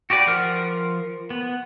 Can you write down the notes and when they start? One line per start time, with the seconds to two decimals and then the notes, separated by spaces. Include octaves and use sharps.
0.10 F#4 G4 B4 D5
0.27 F3 A#4 F#5 F6
1.30 B3